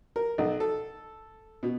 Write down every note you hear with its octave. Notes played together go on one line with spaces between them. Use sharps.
A#4
B1
A4
B2